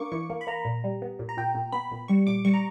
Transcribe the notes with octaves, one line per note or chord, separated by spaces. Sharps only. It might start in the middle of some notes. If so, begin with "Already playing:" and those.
Already playing: A#3 D4 C#6 D6
E3 C#6
A#3
B5
A#3 A#5
A#2
G3
B3
A#2
A#5
A#2 G5
A#2
B3 B5
A#2
G3 C#6
A#2 D6
G3 C#6
A#5